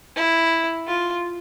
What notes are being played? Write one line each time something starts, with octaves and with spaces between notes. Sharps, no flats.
E4
F4